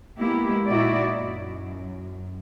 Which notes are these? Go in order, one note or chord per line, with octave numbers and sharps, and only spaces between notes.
G#3 A#3 B3 E4 G4
A#2 D#4 E4 F#4 D5
F#2